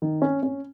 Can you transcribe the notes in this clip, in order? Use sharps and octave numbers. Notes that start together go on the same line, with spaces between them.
D#3
C#4
C#4